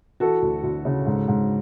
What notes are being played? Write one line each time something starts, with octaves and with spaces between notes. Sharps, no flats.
E3 F#4 A4
D2
D2
C#3
G#2
G#2